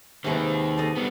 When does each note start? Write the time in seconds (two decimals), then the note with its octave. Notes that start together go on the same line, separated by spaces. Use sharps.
0.24 C3 D#3 G#3 A#3 B3
0.77 A4 D#5
0.96 G3 B3